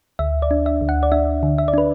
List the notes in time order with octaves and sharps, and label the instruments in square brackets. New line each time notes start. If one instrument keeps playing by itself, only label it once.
[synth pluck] D2 E5
D5
D4
E5
D2
F#5
D5
D4 E5
D3
E5
D5
D4 B4